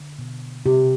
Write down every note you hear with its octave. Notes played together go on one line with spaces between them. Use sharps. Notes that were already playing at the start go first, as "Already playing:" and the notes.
Already playing: D3
B2
C3 G4